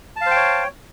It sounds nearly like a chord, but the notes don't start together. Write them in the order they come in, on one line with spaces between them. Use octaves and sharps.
A5 F5 C5 G5 C#5